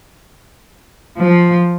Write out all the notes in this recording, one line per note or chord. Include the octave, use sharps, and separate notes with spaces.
F3